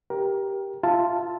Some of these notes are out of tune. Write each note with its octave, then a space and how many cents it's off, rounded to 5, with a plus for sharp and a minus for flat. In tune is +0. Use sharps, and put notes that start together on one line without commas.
G4 +0 A#4 +20
F4 -5 E5 +0 A5 +5